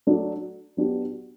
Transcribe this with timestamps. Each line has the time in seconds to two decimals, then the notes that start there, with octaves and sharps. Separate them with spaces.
0.07 F#3 A3 D4
0.77 F#3 B3 D4 G4